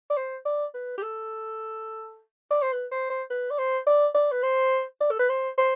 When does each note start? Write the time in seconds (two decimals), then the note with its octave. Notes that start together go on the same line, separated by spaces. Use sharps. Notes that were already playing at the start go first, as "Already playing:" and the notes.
0.10 D5
0.17 C5
0.45 D5
0.74 B4
0.97 G4
1.02 A4
2.51 D5
2.62 C5
2.72 B4
2.92 C5
3.10 C5
3.30 B4
3.50 D5
3.58 C5
3.87 D5
4.14 D5
4.31 B4
4.43 C5
5.01 D5
5.11 A4
5.19 B4
5.29 C5
5.57 C5